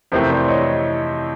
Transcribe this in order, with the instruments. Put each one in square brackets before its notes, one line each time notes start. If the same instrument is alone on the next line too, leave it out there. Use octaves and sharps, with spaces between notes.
[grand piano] F2 C3 E3 A3 C4 [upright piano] A#4 C5
[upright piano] C5 D5
C#5 D#5